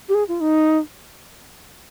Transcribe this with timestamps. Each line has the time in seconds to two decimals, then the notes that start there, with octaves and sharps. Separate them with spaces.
0.09 G4
0.14 G#4
0.28 F4
0.41 D#4